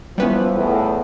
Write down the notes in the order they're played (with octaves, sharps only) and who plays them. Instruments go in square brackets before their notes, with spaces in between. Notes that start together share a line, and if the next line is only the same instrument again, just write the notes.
[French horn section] E3 F3 [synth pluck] G3 B3 C#4
[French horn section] E2 A2